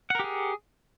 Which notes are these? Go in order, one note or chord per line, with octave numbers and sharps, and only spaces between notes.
G4 G#4 A#4 F#5